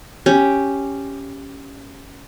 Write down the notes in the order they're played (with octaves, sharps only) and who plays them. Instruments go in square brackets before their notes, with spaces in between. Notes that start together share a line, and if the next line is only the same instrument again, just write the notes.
[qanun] C#4 G4